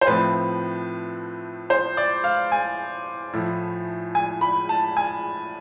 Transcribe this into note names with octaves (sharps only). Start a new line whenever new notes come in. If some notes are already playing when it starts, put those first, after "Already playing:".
C5
A2 F3 A3 C4 B4
C5
D5
F5
G#5
A2 F3 A3 E4
G#5
B5
A5
G#5